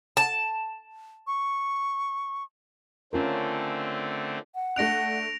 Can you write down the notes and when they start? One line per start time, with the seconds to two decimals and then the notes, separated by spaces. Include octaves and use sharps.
0.17 A5
1.27 C#6
3.13 D3 A3 C4 C#4 F4 A#4
4.55 F#5
4.76 A3 D4 F#6 A#6 D7 F7